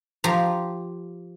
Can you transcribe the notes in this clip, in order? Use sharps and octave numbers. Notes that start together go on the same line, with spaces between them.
F3 G4 A#5